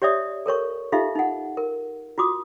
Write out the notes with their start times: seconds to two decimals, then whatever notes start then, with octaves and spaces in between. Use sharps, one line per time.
0.02 G4 C#5 D5 E5 D#6
0.46 A4 A#4 C#5 C#6
0.92 D#4 F4 G4 A4 E5 F5
1.15 D#4 F#5
1.57 A#4
2.18 F4 F#4 D6 D#6